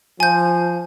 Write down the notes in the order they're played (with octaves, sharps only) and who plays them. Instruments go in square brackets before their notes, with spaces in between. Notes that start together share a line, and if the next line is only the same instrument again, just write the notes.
[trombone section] F3 [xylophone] G#5 G6